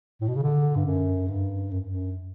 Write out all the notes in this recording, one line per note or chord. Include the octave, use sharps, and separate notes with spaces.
A2
B2
C#3
D3
G2
F#2
G2
F#2
F#2